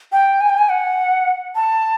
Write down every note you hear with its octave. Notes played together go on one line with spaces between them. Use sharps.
G5
G#5
G5
G#5
F#5
A5